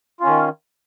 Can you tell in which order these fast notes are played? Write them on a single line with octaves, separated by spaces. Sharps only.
F4 C#4 D#3